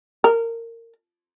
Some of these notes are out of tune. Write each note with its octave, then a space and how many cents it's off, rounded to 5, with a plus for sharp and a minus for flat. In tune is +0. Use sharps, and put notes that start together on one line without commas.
A#4 -20